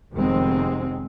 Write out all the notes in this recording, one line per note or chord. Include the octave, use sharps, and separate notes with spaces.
F1 C3 D#3 G#3 B3 C4